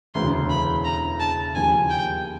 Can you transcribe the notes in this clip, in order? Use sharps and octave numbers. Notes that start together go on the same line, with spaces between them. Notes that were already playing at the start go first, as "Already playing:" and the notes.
E1 D2 C#3 E3 C6
B5
A#5
A5
D#2 C#3 F3 G#5
G5